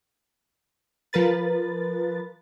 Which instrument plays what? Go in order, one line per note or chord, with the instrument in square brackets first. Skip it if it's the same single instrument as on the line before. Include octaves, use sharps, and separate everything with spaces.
[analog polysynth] F3 A#4 B4 A6